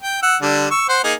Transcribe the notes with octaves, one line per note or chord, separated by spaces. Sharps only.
G5
F#5 E6
D3 G3 D4
C#6 E6
C5 F#5 C6
A#3 D#4 G#4